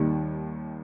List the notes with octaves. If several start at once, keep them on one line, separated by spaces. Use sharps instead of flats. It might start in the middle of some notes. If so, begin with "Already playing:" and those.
Already playing: D#2 D#3 G3